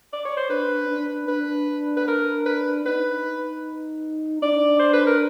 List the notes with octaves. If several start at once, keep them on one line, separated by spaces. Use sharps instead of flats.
D5
C#5
C5
D4 B4
D4
D4 B4
B4
A#4
B4
D#4 B4
D4 D5
C5
B4
A#4